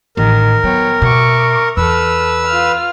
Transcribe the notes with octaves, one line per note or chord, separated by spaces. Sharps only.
A1 D#3 A#4
F#3 B3 C#5 G5
B2 E5 C#6 D6
E2 A4 B4 E6 F6
F4 F6